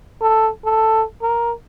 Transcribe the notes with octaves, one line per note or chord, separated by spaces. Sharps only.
A4
A4
A#4